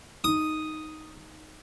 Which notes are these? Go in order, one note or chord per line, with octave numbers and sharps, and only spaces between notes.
D#4 D#6